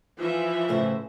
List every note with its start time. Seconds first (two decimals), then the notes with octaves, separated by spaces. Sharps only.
0.18 E3 F3 F4 E5
0.69 A2 C#3 C5